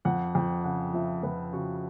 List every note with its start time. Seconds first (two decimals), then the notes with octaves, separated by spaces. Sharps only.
0.05 F2 F#5
0.35 F2 G5
0.64 C#3 F#5
0.94 F3 E5
1.23 F2 B4
1.53 C#3 F#4